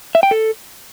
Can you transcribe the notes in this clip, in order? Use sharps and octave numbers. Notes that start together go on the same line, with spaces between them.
E5
G5
A4